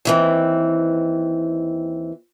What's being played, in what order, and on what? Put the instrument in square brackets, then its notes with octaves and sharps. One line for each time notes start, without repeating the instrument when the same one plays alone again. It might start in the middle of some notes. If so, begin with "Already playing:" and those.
[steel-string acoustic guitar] D#2 E3 C4